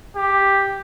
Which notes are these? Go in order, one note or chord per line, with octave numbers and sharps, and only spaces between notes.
G4